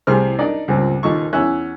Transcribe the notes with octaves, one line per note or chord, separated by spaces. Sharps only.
C2 A2 C3 G#4 C5 F6
D4 D#4 A#4 D5 D#5
C#2 G2 A#2 C4
D#2 A#2 F3 D#4 A4 C#6
E2 C#4 E4 E5 F#6